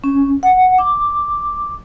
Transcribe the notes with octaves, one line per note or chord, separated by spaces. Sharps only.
C#4
F#5
D6